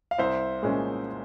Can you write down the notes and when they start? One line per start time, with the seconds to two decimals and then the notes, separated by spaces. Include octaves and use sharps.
0.11 F5
0.18 C2 C5 E5
0.63 A#2 G#3 C#4